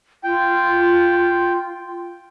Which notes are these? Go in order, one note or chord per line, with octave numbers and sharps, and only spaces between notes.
F4 G5